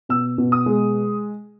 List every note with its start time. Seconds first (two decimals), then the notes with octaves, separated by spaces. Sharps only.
0.09 B2 E6
0.38 B2
0.52 D#6
0.66 G#3